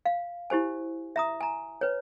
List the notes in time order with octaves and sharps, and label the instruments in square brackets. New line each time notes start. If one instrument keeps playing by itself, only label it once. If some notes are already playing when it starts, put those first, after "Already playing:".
[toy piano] F5
E4 G4 C5 G#5
E5 A#5 D#6
G#5 A#5
B4 C#5